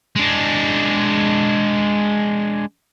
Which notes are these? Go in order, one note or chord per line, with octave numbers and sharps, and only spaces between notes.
G#3 D4